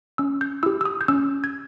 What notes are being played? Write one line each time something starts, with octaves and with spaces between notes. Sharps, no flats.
C#4 E6
G6
E4 G4 E6
E6
D#6
G6
C#4 E6
G#6